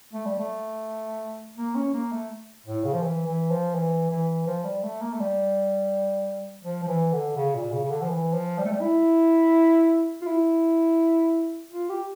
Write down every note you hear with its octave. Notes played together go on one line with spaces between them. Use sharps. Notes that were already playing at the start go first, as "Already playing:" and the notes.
A3
G3
A3
A#3
C#4
A#3
A3
A2
C#3
F3
E3
E3
F3
E3
E3
F3
G3
A3
A#3
A3
G3
F3
F3
E3
D3
C#3
A#2
C#3
C#3
D3
F3
E3
F3
G3
A3
G3
E4
F4
E4
F4
G4